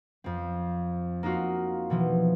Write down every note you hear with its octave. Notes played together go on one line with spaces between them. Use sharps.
F2 C4
A#3 D#4 F4 F#4
B2 E3 F3